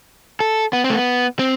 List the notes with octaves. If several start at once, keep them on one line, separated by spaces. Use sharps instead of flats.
A4
B3
C4
A3
B3
C4